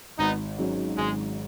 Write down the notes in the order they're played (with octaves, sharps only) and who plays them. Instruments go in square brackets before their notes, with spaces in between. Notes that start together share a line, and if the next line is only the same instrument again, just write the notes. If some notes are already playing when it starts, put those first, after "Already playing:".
[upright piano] G#1 [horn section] B3 D#4
[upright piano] G#2 F#3 C#4
[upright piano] G#1 [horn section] G#3